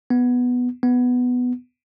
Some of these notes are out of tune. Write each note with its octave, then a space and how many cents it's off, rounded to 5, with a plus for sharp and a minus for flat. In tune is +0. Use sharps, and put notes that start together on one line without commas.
B3 +0
B3 +5